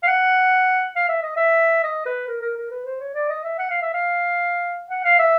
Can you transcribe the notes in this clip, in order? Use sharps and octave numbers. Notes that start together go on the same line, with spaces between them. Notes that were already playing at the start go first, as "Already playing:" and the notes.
F5
F#5
F5
E5
D#5
E5
D#5
B4
A#4
A#4
A#4
B4
C5
C#5
D5
D#5
E5
F#5
F5
E5
F5
F#5
F5
E5